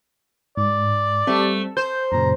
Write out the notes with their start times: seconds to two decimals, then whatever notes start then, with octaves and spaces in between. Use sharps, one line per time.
0.57 G#2 D5
1.27 G3 A3 C4
1.77 C5 G6
2.12 F#2 A#2 C#3 A#5